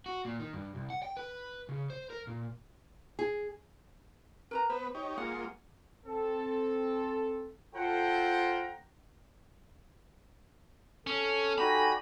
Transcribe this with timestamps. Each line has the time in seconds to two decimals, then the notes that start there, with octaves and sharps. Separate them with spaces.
0.06 F#4
0.25 A#2
0.40 D#3
0.53 G2
0.75 C2
0.90 F#5
1.03 G5
1.17 B4
1.69 C#3
1.90 C5
2.10 A#4
2.27 A#2
3.19 G#4
4.51 A#4 B4 A#5
4.70 B3 B4 C5
4.95 D#4 G4 C#5
5.18 G#3 A#3 F4 F#5
6.06 C4 A4
7.75 F4 A4 C5 F#5 G5 A#5
11.07 C#4 A4
11.58 G3 D#4 F#4 G4 G#5 B5